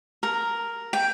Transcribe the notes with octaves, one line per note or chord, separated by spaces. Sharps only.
A#4
G5